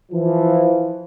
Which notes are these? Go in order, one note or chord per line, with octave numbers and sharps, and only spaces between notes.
E3 F3